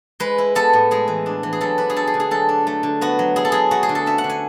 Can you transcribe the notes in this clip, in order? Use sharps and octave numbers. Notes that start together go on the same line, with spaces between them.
G#3 B4
E4
B3 A4
A2
G#3 G#4
E3
D4
E3
G#4
F#3 A4
D4 B4
G#4
A3 A4
G#4
D3
G#4
F#3 A4
D4
A3
D3
B3 F#4
F#3
E4 G#4
A4
F#3 G#4
A3 F#4
G#4
D3
A4
C#4 E5
F#5
D3
G#5